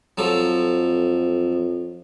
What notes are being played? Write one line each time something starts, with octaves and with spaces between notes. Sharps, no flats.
F2 F3 F#3 A4